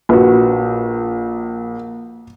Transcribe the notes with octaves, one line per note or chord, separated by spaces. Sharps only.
A#1 F#4 B4